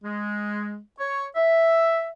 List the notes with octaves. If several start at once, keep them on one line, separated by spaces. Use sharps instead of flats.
G#3
C#5
E5